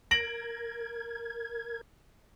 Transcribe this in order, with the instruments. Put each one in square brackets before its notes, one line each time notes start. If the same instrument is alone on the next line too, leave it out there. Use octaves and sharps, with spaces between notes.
[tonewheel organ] A#4 G#6 [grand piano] A#6 D7 F#7